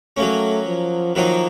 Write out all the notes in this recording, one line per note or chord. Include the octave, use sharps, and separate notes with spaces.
F#3 A3 A#3 C#4
F3
D#3 F3 F#3 A#3 D#4